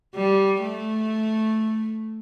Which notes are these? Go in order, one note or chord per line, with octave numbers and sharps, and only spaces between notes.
G3
A3